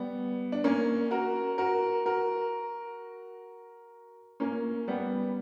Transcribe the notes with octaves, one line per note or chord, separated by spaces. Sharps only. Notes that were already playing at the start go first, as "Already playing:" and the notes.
Already playing: G3 B3
D4
A#3 C#4
F#4 A#4
F#4 A#4
F#4 A#4
A#3 C#4
G3 B3